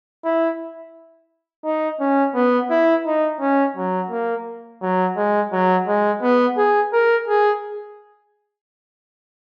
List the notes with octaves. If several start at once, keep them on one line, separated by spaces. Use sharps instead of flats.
E4
D#4
C#4
B3
E4
D#4
C#4
F#3
A#3
F#3
G#3
F#3
G#3
B3
G#4
A#4
G#4